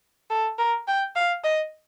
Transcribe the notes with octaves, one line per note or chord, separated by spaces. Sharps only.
A4
A#4
G5
F5
D#5